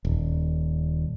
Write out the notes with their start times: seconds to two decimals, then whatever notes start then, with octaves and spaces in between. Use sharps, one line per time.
0.05 D#1